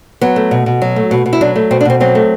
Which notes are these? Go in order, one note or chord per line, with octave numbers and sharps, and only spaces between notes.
F#3 B3
A3
B2
B2
F#3
A3
B2
B2
E4
F#3 D4
A3
B2 C4
D4
B2 C4
F#3 C4
A3